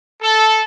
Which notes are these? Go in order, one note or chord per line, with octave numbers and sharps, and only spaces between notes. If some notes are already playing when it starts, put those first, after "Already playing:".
A4